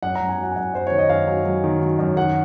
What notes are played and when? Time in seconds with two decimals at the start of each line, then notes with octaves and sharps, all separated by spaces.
0.03 F#2 F#5
0.15 A#5
0.20 F#2
0.29 G#5
0.38 F#3
0.43 F#5
0.52 G#5
0.56 F#2 F#5
0.74 F#2 C5
0.87 D#3 C#5
0.98 D#5
1.09 F#2 F5
1.27 F#3
1.45 F#3
1.64 D#3
1.81 F#3
1.99 F#2
2.16 D#3 F#5